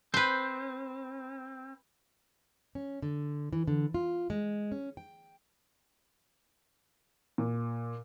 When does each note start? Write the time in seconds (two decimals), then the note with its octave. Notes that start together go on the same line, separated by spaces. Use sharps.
0.14 C4 B4 C5
2.75 C#4
3.02 D3
3.53 E3
3.68 D3
3.94 F4
4.30 G#3
4.72 C#4
4.97 G5
7.38 A#2